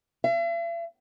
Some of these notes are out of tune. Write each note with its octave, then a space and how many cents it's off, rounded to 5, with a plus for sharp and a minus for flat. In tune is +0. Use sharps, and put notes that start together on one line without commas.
E5 +45